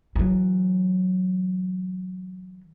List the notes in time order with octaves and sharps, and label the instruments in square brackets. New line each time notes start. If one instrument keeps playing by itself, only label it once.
[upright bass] E3 F#3